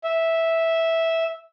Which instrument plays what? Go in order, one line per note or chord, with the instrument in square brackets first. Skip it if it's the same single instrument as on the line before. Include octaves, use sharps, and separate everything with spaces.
[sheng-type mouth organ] E5